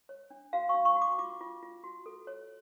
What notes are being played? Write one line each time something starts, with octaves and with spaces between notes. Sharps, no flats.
C#5
D4
F#4 F5
C#6
D4
C#6
F#4
D6
F4 D6
F4
F4
F#4
A4
C#5